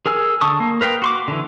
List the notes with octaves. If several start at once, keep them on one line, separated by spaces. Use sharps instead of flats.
G#4 A#4 G#5 E6
D3 A5 C#6 D#6
A#3
A#4 B4 F5 G5
F#4 C6 D6
D3 E3